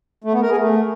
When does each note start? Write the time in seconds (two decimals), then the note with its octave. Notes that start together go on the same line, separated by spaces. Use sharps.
0.24 A3
0.33 B3
0.42 A#4
0.51 G#4
0.60 A3